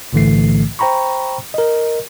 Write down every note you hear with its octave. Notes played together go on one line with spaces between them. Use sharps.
B1 A2 D3 E3 A3 C7
C5 G5 A#5 B5 C#6
A#4 D#5